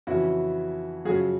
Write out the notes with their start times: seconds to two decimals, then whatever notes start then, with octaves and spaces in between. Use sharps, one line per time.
0.07 F2 C#3 E3 E4 F#4
1.05 F#2 C#3 F3 F#4 G#4